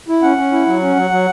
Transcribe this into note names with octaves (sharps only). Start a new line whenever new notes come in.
E4
C#4 F#5
C#4
E4
F#3
C#4
F#3
F#3